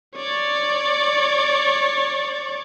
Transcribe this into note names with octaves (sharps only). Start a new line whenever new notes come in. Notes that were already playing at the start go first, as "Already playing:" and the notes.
C#5 D5